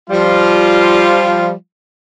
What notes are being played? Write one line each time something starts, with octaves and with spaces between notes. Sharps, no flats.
F3 G3 F4